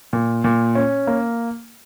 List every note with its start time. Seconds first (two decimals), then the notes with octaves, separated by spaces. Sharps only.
0.13 A#2
0.44 A#2
0.75 C#4
1.07 A#3